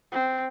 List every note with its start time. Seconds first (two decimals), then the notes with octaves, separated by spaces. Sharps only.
0.12 C4